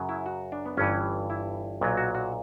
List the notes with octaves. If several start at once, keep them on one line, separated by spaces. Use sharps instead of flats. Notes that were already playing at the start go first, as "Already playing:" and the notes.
Already playing: F#2 C#3 F#3
E4
F#4
D4
B3
G1 G2 E3 C#4
E4
B1 A#2 F#3
F#4
F#4